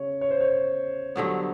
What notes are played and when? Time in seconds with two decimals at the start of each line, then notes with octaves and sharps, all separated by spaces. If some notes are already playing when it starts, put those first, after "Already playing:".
Already playing: C#3 C#5
0.21 C#5
0.31 C5
0.40 C#5
1.16 G2 D3 F#3 B3